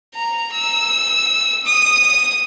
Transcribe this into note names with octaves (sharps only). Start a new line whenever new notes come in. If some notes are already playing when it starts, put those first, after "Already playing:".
A#5
E6
D#6